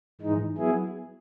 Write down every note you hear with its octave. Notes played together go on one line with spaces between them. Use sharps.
G#2 E3 G#3 D#4
F#3 B3 E4 G#4